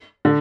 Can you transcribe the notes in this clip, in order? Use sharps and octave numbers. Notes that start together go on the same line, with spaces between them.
D3